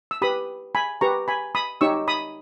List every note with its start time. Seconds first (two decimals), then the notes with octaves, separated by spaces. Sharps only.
0.11 E6
0.22 G4 B4 B5 D#6
0.75 G#5 B5
1.01 G4 B4 A#5 C#6
1.28 G#5 B5
1.55 B5 D#6
1.81 D#4 G4 C#5 C#6 E6
2.08 B5 D#6